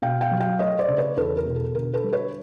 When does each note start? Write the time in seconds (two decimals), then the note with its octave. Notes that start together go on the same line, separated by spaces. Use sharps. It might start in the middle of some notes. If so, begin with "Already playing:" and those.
0.02 B2 F5 G5
0.21 F5 G5
0.31 F#3
0.40 F5 G5
0.59 A3 C#5 D#5
0.79 C5 D5
0.88 C#3
0.98 B4 C#5
1.17 E2 A4 B4
1.37 A#4
1.46 B2
1.56 A4
1.75 D3 A#4
1.94 A4 B4
2.04 G3
2.13 B4 C#5